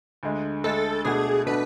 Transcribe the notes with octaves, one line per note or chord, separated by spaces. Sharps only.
D2 D3 G#3
D2 D3 G#3 A4
B2 A3 D4 F#4 G#4
B2 A3 D4 F#4 B4